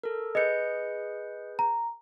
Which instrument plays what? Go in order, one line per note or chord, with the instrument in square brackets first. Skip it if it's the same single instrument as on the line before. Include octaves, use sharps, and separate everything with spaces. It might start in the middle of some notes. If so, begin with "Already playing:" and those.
[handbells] A4 A#4
[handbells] G#4 B4 G6 [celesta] D#5 C#7
[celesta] A#5